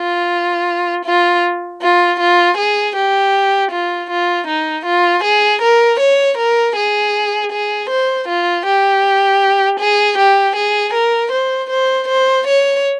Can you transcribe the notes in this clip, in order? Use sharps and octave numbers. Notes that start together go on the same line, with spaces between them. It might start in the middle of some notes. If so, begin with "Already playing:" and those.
Already playing: F4
F4
F4
F4
G#4
G4
F4
F4
D#4
F4
G#4
A#4
C#5
A#4
G#4
G#4
C5
F4
G4
G#4
G4
G#4
A#4
C5
C5
C5
C#5